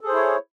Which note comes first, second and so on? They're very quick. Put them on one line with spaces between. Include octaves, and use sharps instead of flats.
A4 G#4 C5 E4 C#5